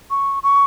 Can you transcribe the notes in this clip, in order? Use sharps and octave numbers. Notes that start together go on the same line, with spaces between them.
C#6
C#6